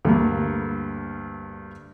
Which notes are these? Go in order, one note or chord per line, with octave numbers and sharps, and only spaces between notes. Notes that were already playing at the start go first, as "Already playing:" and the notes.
D2 G2 A#3